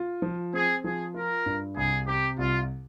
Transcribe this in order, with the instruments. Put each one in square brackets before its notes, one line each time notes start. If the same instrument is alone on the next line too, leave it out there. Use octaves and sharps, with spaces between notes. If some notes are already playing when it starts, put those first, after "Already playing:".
Already playing: [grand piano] F4
F3
[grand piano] C4 [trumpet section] G#4
[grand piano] F3 [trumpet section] G#4
[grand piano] F4 [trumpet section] A#4
[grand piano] G2
[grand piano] C2 [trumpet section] G#4
[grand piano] C3 [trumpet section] G4
[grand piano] C2 [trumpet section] F4